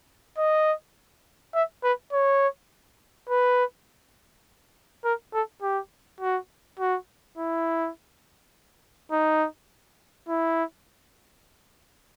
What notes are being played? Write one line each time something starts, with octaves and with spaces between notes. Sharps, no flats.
D#5
E5
B4
C#5
B4
A#4
A4
G4
F#4
F#4
E4
D#4
E4